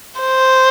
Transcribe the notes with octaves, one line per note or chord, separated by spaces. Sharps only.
C5